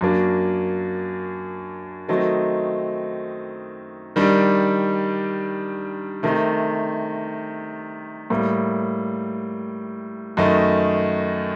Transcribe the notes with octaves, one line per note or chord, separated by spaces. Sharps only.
F#2 F#3 A#3 D4
D#3 F#3 A3 C4 D#4
D#3 G3 D4
C3 D#3 A3
A2 G3 A#3
F#2 D#3 A3 D#4